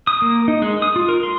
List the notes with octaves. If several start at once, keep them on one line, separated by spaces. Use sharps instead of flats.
D#6
A#3
D#4
G#3
D#6
F4
A#4
C6